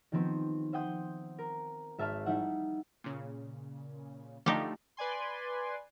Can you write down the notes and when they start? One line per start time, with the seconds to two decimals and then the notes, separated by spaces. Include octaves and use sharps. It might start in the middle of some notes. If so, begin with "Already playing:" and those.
0.12 D#3 F3 B3 C4 G4
0.73 C5 E5 F#5 G5 D#6 G6
1.38 A#4
1.98 G#1 E5 A5 F6 E7
2.26 G3 D#4 E4 E5 F#5
3.04 A#2 C#3
4.46 D3 F3 A3 D#4 G4
4.97 B4 D5 G#5 C6